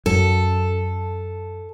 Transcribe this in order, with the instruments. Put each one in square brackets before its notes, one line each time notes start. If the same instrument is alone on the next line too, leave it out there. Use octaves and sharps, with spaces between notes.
[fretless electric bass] F#2 [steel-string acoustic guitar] A4